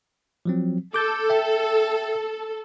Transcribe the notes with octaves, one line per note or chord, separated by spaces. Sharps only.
F3 F#3 C4
A4 D6 G6 A6
E5 G5